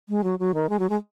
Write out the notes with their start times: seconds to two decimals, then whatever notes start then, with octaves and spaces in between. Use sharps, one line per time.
0.09 G#3
0.24 F#3
0.39 F#3
0.54 D#3
0.69 G#3
0.79 F#3
0.89 G#3